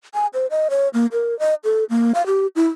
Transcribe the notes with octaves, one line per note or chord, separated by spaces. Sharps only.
G#5
C5
D#5
C#5
A#3
A#4
D#5
A4
A#3
F5
G4
E4